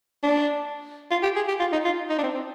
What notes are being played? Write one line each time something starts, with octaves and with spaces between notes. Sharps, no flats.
D4
F4
G4
G#4
G4
F4
D#4
F4
D#4
D4
C4
C4